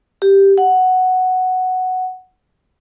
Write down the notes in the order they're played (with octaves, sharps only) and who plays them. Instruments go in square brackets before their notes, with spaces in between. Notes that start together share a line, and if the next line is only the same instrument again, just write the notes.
[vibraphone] G4
F#5